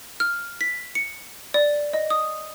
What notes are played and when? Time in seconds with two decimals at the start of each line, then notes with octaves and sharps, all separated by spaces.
0.20 F6
0.61 B6
0.95 C#7
1.54 D5
1.93 D#5
2.10 D#6